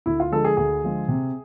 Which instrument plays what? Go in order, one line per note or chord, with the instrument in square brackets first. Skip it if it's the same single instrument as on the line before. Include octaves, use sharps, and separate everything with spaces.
[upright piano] D2 E4
F4
D3 F3 G#3 A4
G#4
D2 G#4
D3 F3 G#3
C3